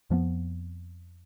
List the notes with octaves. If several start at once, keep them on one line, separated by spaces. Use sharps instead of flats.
F2 F3 F#3 B3